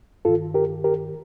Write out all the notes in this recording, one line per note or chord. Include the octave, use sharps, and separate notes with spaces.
G2 D#3 F4 A4
G4 A#4
G4 A#4